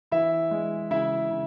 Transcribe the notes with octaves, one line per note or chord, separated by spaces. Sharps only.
E3 E4 E5
G#3
C#3 E4 E5
C#3